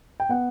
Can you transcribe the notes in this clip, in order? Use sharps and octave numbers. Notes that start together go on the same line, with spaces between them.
G5
B3 F#5